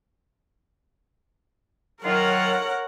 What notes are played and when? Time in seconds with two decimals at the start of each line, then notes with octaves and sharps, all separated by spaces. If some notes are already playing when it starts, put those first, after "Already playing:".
2.04 D#3 F#3 F4 A#4 C#5 F#5